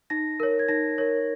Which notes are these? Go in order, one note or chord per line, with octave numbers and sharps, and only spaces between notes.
D#4 A#6
A#4 C#5
G#6
D#4 A#6
A#4 C#5